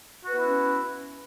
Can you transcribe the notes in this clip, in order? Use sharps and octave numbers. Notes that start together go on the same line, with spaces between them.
B3 C#4 E4 F#4 B4